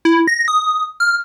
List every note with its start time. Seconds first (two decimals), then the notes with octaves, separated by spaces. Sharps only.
0.05 E4
0.27 A#6
0.48 D#6
1.00 F6